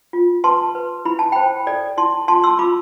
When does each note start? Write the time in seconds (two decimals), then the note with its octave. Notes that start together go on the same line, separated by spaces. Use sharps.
0.13 F4
0.44 B4 A5 C6
0.75 B4
1.05 E4 B5
1.19 A5
1.32 C5 G5 B5
1.67 A4 D5
1.97 E4 A5 C6
2.28 F4 A5 C6
2.43 C6 E6
2.59 F4 B5 D6